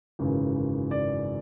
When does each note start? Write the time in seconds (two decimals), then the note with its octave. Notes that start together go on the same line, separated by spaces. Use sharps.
0.19 G#1 F#2 C#3 E3
0.91 D5